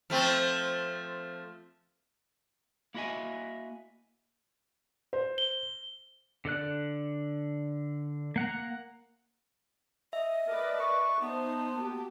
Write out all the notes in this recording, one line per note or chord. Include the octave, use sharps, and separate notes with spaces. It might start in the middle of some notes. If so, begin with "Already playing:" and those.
F3 A3 C4
A#3 E4 F#4 D#5 E5 G#5
C5
G7
D3 A4 D5 F#6
A#3 F#5 A#5
D#5 E5
A#4 B4 D5 A5
C#6
B3 D#4 C5 A5
A#3 F#4 G4